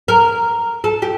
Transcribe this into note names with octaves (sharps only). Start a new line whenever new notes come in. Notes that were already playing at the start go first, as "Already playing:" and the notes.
A#4
A4
G4